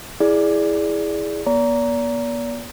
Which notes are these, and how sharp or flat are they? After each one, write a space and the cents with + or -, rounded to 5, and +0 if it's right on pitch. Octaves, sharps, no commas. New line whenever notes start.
E4 +0 G#4 +0 D5 +0
B3 -45 D5 -40 A#5 +0